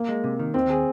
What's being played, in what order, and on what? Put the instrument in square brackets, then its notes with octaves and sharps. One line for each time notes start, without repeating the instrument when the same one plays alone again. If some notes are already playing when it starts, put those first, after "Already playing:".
Already playing: [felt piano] A#3
[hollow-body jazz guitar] G#3
C3
D#3
[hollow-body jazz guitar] D#2 [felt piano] C4
[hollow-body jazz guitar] G#4